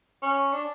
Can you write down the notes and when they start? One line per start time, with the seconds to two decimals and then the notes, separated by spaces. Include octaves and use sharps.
0.23 C#4
0.53 D4